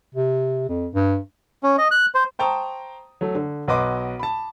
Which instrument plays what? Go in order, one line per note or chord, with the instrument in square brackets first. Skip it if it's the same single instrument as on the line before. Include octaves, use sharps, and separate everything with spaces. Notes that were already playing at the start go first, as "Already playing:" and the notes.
[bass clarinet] C3
F2
G2
[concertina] C#4
D#5
F#6
C5
[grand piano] C5 G5 A5 A#5 C#6 D#6
F#3 A3
D3
B1 F#4 B4 D#5 C6 D6
A5 B5